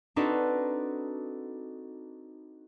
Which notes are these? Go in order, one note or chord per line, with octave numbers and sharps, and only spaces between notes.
C4 D4 D#4 F#4 A4 B4